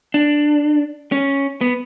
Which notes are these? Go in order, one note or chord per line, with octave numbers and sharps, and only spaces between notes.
D4
C#4
B3